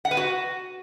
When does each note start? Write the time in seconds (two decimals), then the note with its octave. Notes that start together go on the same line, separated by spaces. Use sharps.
0.05 F#5
0.11 B4
0.17 F#4